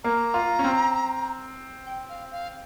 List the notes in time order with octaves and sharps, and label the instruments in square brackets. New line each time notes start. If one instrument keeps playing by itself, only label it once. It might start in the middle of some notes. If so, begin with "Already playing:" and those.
[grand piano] A#3 [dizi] A#5
[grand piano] F4
C#4
C4
[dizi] G5
F5
F5